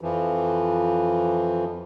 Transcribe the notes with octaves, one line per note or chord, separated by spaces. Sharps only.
F2 E3 F3